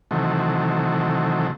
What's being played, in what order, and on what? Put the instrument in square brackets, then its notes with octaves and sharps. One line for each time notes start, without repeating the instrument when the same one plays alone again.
[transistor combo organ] C3 D#3 E3 F#3 A3